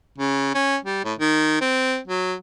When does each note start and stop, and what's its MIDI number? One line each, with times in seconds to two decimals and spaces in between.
0.18 0.52 49
0.55 0.77 61
0.85 1.00 55
1.05 1.14 45
1.19 1.60 51
1.61 1.99 60
2.07 2.35 54